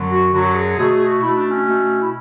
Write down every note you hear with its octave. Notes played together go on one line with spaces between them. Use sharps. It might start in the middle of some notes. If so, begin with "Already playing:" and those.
Already playing: F#2 D3 F#3
F#4
F#2 D3 F#3 F#4
G#4
B2 A3 G#4
G#4
F#4
B2 A3 E4
D4
C#4
B2 A3
E4